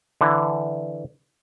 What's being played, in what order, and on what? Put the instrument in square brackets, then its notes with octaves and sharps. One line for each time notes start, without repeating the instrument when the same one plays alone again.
[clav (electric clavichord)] D3 E3